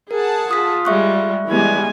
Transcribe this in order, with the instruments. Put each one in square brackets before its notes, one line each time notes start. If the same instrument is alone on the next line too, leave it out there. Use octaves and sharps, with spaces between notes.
[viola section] G#4 F#5 A5 [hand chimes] A#4
[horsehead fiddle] F4 [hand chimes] D#6 B6
[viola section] G3 G#3 [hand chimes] E5 C#6 F#6
[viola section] E3 G3 B3 [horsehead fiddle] G#3 G#5